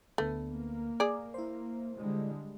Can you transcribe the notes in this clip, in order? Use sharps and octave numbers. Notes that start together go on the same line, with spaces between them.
D2 D3 A3 B3
A#3
G#4 D5
E4 C5
D3 G3 G#3